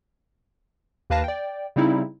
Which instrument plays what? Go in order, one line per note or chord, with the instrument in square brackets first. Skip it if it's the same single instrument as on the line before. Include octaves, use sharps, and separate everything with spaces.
[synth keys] D#2 A#3 B4 F5 A5 A#6
D5 G5
C#3 G3 C4 D#4 E4